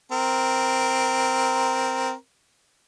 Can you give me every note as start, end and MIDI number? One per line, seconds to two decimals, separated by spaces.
0.12 2.13 60
0.12 2.13 70